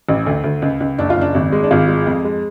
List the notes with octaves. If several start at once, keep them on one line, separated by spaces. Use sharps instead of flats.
A1
D2
D2
C#2
C#2
F#1 D4
F4
F#1 D4
G#1
G#3
D4
G#1 F4
G#3
F2
G#3